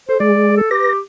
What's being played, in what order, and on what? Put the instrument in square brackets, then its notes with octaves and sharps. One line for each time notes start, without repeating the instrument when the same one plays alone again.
[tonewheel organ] A4 [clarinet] C5
[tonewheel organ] G#3 G#4 [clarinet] D5
[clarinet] A4
[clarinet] G4 [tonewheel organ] B4 A#6